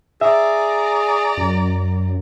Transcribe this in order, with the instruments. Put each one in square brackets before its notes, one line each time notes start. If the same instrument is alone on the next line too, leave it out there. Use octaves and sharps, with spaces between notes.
[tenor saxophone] G#4 [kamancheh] D5 A#5 [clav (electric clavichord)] E5
[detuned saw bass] F#2